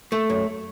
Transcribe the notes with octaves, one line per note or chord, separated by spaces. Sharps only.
A3
F#2